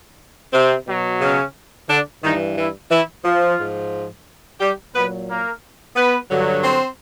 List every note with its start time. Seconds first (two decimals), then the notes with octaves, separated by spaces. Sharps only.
0.53 C3 C4
0.87 B2 F#3
1.21 C#3 C#4
1.89 D3 D4
2.22 G2 D#3 E3 D#4
2.56 E3 E4
2.91 E3 E4
3.24 F3 F4
3.59 G#2 F3
4.60 G3 G4
4.94 A#2 F#3 B3 B4
5.28 A#3 A#4
5.96 B3 B4
6.30 G2 D3 F#3
6.64 C4 C5